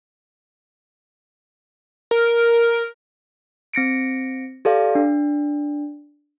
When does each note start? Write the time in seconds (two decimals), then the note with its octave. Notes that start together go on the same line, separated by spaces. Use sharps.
2.11 A#4
3.74 C4 A#6 C#7 D7
4.65 G4 A4 D5 F5
4.95 D4